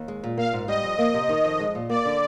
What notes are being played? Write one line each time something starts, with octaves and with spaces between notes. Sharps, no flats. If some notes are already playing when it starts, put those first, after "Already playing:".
Already playing: D#2
G#3
A#2
A#3 F5
G#2
G3 D#5
F2
A#3 D#5
C3
D#3
F2
G#3
A#2
A#3 D5
D3